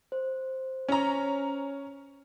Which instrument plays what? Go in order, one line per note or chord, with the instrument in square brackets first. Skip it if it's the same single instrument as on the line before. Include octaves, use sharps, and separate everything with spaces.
[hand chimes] C5
[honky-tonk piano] C#4 A#5